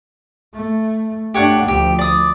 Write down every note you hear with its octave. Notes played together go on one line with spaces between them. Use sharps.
A3
A3 D4 G4 C#5 F#5
D2 F3 G4
D5 D#6